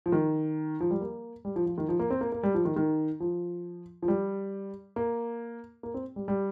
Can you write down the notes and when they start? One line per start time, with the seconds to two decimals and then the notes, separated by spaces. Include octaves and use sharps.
0.06 F3
0.12 D#3
0.80 F3
0.91 G3
1.01 A#3
1.45 G3
1.56 F3
1.66 F3
1.78 D#3
1.89 F3
1.99 A#3
2.10 C4
2.21 A#3
2.32 A#3
2.43 G3
2.54 F3
2.65 D#3
2.76 D#3
3.20 F3
4.02 F3
4.08 G3
4.96 A#3
5.83 A#3
5.94 C4
6.16 G3
6.28 G3